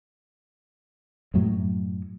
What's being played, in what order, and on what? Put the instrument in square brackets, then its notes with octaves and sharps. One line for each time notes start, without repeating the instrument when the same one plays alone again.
[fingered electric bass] F#2 A2 F#3